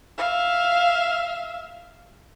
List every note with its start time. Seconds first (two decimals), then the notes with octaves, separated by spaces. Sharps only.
0.18 E5 F5